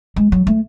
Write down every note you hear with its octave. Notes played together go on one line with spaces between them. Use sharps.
G#3
F#3
A3